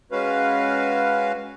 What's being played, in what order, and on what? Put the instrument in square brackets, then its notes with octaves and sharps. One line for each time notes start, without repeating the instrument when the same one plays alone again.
[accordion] G#3 C#4 F#4 B4 F5